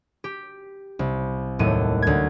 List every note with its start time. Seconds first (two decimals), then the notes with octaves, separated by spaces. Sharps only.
0.24 G4
0.99 C2
1.59 D#2 A2 F#3 A3 D#7
2.02 D2 G#6